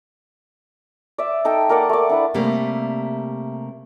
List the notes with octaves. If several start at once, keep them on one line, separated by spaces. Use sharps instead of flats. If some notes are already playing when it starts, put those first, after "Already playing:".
D5 E5
D#4 A4 G5
A#3 A#4 D5 F#5
A3 D5
D4 E4 B4
C3 G3 A3 A#3